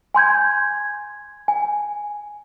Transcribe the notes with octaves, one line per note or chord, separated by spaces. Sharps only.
G#5 C6 G6 G#6
G#5